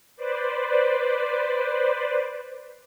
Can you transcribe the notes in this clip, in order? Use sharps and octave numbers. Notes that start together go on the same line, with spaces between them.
B4 C5 D5